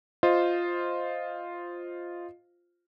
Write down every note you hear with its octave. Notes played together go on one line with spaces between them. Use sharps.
F4 C5 D#5